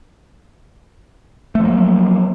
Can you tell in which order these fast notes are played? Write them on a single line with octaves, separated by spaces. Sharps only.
A3 F3 A#3 F#3